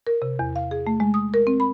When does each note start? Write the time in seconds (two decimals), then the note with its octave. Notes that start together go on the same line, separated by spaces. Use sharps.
0.07 A#4
0.22 C3
0.39 E2
0.56 F5
0.71 G#4
0.87 A3
1.00 G#3
1.14 D#6
1.34 A#4
1.47 C4
1.60 B5